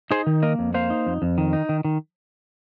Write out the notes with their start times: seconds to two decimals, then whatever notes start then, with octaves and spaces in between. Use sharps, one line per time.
0.11 D#4 G#4 C5
0.27 D#3
0.43 A#3 A#4 D#5
0.59 F2
0.74 A#3 C5 F5
0.90 D#4
1.07 F2
1.22 F2
1.38 D#3
1.53 D#4
1.69 D#3
1.85 D#3